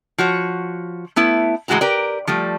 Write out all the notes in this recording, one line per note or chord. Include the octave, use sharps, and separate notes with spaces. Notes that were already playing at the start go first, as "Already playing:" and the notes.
F3 F#4 C#5
A3 B3 E4
A2 E3 G#3 F#4 A5 A#5
G4 A#4 B4 D5
F3 G3 A3